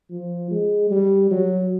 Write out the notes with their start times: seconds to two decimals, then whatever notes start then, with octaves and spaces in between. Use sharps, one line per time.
0.11 F3
0.51 G#3
0.91 G3
1.31 F#3